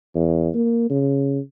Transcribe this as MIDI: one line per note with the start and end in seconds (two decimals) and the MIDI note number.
0.15 0.49 40
0.54 0.87 58
0.90 1.39 49